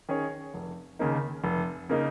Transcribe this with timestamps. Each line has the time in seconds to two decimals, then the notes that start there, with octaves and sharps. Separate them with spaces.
0.09 D#3 C#4 G#4 C#5
0.54 F1
0.99 D#2 C#3 A#3 D#4
1.44 F1
1.89 C#3 A#3 D#4